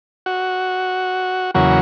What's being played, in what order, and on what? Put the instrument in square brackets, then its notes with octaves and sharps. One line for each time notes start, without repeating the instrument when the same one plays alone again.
[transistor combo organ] F#4
E2 C#3 F#3 A#3 F#4